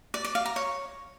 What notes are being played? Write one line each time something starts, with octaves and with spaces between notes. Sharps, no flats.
D5
D5
F5
A#5
C#5